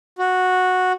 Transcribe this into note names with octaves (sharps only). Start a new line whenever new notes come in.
F#4